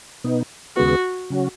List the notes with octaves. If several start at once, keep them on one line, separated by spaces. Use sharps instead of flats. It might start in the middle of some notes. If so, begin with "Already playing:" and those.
B2 B3 D#4
D#2 C#3 G#3 B3 F#4
C#3 F#3 C#4 F#4